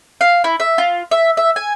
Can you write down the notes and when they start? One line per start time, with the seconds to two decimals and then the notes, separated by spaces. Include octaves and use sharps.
0.21 F5
0.44 E4
0.60 E5
0.78 F4
1.11 E5
1.37 E5
1.56 G#5